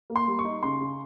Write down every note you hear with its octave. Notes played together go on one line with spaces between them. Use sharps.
A#3
C6
G3
C#6
D#4
C#3 C6
C#3